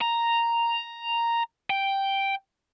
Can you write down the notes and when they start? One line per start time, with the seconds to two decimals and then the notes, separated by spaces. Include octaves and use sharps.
0.01 A#5
1.70 G5